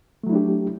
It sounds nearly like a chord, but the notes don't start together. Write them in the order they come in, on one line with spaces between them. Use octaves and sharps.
A3 F#3 E4 D4 G4